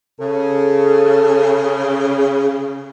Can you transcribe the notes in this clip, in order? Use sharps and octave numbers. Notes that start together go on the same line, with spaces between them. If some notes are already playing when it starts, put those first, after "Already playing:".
C#3 A4